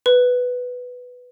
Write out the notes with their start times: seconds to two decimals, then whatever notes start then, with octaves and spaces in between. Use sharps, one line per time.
0.06 B4